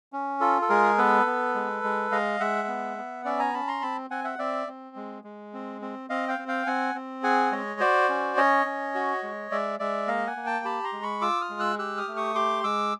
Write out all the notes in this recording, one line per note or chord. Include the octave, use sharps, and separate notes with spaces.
C#4
F4 A4
A4
G#3 G#4 A#4
B3 A4 B4
B3
G#3
G#3
G#3 D#5 F5
G#3 E5 F#5
B3
B3
C#4 D5 E5
G#5 A#5
C#4 A5 B5
A#5 C6
C4 A5 B5
C4 F#5 G#5
E5 F#5
C4 D5 E5
C4
G#3
G#3
C4
C4
C4 D#5 F5
F5 G5
C4
F5 G5
C4 F#5 G#5
C4
G#4 F#5 G#5
G#3 C#5 D#5
F#4 C5 D5
C#4
C#4 C#5 D#5
C#4
F#4
G#3
G#3 D5 E5
G#3 D5 E5
A#3 D#5 F5
F#5 G#5
A#3
G5 A5
G4 A5 B5
A#5 C6
G#3
B5 C#6
F4 D6 E6
D#6 F6
G#3
E6 F#6
G4 E6 F#6
D#6 F6
A3
C#6 D#6
G4 C6 D6
G#3 D6 E6